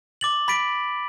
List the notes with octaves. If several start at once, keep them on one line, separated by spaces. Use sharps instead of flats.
D6 A6 F#7
B5 A6 B6 D7